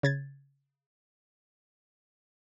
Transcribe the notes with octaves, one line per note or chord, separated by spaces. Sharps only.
C#3 G#6 A6